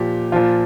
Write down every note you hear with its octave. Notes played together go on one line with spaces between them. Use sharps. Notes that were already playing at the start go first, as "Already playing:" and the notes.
Already playing: A#2 F3 G4
A#2 F3 F4